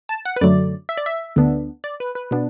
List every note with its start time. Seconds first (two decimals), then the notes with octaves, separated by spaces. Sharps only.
0.09 A5
0.25 F#5
0.36 B4
0.41 F#2 D3 F#3 A3 D5
0.89 E5
0.97 D5
1.06 E5
1.36 D2 D3 B3 D4
1.84 D5
2.00 B4
2.15 B4
2.31 B2 B3 D4